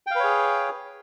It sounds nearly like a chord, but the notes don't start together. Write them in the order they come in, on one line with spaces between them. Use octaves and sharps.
G5 F5 B4 C#5 G#4